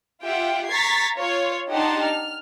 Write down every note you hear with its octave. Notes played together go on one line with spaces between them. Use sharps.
F4 G4 E5 F#5 G5
A#5 C#6 G#6 A6 B6 C7
F4 C#5
D4 D#4 G4 F#5 A5 C6
F6